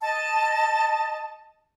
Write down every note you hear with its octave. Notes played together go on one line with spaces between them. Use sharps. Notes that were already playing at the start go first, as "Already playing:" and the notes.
D#5 A5